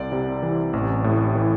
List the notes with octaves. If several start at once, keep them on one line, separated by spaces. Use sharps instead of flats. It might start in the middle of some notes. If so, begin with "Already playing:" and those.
Already playing: C2 D5
C3
E3
A1
A2
E3